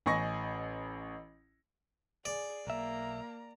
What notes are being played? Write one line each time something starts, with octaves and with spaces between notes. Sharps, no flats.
A1 D#5 G#5 C#6 A#6
G#4 D5
B1 A#3 E5 A#5